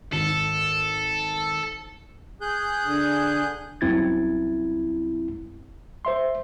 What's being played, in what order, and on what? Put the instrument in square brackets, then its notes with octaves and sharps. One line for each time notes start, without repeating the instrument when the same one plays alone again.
[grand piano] G#1 [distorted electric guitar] A4
[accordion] G#4 F#6 G6
[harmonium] D3
[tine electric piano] C2 F#2 C4 E4 G#6 A6
C5 E5 C6